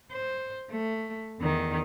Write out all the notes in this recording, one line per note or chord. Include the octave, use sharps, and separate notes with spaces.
C5
A3
E2 D#3